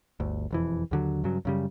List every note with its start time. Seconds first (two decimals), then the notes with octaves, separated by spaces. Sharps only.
0.20 G1 D2
0.51 E1 F2 E3
0.91 D#2 D3 F#3
1.24 G2 C#3 F#3
1.45 F#2 C#3 G3